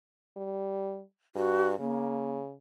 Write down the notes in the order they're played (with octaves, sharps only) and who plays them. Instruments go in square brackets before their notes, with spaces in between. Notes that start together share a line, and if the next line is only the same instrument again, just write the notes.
[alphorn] G3
[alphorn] G2 [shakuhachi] F#4
[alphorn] C#3 [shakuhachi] A#3